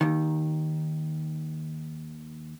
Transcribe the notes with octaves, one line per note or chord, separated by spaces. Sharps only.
D#2 D#3